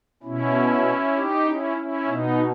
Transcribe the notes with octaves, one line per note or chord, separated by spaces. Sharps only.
B2 C#4 E4
D#4 G4
C#4 E4
C#4 E4
B2 B3 D#4